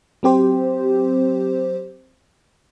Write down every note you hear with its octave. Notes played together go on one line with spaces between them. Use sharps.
F#3 C4 G4 C5